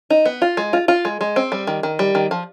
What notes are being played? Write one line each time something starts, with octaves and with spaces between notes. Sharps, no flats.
D#4
B3
F4
G#3
F4
F4
G#3
G#3
C4
G3
D#3
D#3
G3
D#3
F3